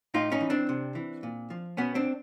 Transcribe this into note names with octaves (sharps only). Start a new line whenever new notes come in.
A2 D#4 F4
C#4 D#4
E3
C4 D4
C3
E3
A#2
F3
B2 B3 C#4
C4 D4